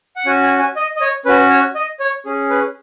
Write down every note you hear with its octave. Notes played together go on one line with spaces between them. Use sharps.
F#5
C#4 F#4 G#5
G#5
G#5
D#5
D#5
C#5
C#4 F#4 B4
C#5
D#5
C#5
C#4 G#4
B4